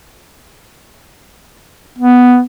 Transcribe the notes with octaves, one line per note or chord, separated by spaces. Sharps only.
B3